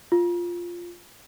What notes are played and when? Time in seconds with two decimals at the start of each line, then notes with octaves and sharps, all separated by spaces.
0.12 F4